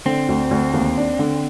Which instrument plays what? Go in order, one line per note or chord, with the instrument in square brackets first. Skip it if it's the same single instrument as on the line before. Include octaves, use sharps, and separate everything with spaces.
[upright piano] D3 [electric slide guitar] C4
[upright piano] D2
D2
D#2
D4
D3